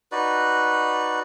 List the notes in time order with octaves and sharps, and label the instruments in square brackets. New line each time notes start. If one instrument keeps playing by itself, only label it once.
[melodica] D#4 F#4 B4 D5